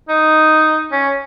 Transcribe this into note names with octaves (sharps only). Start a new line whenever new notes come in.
D#4
C#4